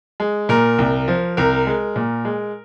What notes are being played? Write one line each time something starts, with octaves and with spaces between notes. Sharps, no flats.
G#3
A#2 A#4
C2
F3
C2 A#4
G#3
A#2
G#3